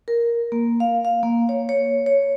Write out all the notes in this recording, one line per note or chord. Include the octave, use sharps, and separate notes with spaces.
A#4
A#3
F5
F5
A#3
C#5
C#5
C#5